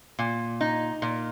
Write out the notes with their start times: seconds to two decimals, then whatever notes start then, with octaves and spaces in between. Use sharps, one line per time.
0.19 A#2
0.61 D#4
1.02 A#2